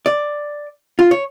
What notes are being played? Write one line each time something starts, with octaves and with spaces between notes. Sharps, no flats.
D5
F4
C#5